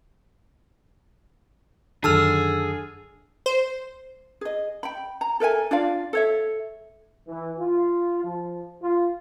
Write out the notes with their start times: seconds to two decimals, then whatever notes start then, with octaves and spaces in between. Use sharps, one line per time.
2.04 F#2 D3 D#3 G#4 A5 E6 F6
3.46 C5
4.41 G#4 D#5
4.83 G5 B5
5.21 A#5
5.40 A4 A#4 E5 G#5
5.71 D4 F4 D5 F5
6.13 A4 C#5 E5
7.27 E3
7.58 F4
8.24 F3
8.82 F4